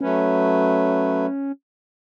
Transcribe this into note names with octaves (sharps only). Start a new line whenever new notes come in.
F#3 A3 C#4 B4